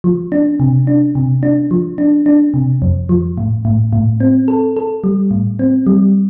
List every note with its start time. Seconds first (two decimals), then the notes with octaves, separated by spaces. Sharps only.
0.04 F3
0.32 D4
0.60 C3
0.87 D4
1.15 C3
1.43 D4
1.71 F3
1.98 D4
2.26 D4
2.54 C3
2.82 F2
3.09 F3
3.38 A2
3.65 A2
3.93 A2
4.20 C4
4.48 A4
4.77 A4
5.04 G3
5.31 A2
5.59 C4
5.87 G3